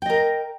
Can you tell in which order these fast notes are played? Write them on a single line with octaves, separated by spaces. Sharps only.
G5 D#5 A#4